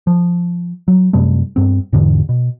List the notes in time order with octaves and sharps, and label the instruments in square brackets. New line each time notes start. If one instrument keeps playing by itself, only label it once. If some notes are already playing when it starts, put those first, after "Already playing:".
[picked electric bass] F3
F#3
F#2 C3 G3 A3
G2 B3 C4
E2 G#2 D3 E3
B2